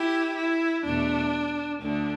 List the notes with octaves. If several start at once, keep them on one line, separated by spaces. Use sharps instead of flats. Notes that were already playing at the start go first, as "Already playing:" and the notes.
Already playing: E4 G4
E4
E2 B2 A3 D4
D2 D3 A3 D4